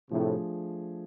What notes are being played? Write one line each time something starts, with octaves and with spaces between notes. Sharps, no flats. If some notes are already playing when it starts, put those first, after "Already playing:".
A2 C3 F3 A3 D4 G#4